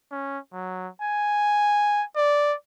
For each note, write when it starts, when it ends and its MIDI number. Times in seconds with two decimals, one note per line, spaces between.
0.11 0.39 61
0.52 0.88 54
1.01 2.04 80
2.16 2.54 74